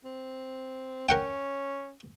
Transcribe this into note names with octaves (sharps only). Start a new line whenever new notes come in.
C4
C#4 A#4 F#5 G5